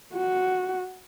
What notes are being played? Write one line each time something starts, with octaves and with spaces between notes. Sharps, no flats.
F#4